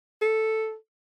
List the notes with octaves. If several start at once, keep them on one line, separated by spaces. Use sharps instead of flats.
A4